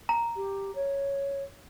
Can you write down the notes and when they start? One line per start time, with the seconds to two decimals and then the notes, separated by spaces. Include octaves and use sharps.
0.09 A#5
0.36 G4
0.75 C#5